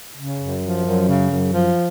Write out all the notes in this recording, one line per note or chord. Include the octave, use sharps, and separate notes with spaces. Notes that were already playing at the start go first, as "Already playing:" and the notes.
C#3
F#2
F3
F#2
C#3
F#2
F3